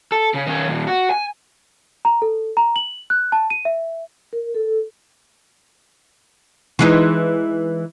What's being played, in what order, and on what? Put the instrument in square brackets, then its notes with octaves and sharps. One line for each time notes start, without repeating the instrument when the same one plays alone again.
[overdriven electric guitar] A4
C#3
D#3 C#4
D#2 A#2
F#4
G#5
[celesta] A#5
A4
A#5
F#7
F#6
A5
D#7
E5
[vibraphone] A#4
A4
[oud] E3 G#3 D#4